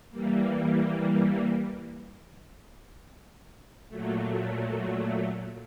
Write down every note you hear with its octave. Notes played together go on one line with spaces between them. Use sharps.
E3 G3 A#3
A#2 F#3 A3